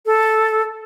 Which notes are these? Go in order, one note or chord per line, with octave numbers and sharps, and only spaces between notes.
A4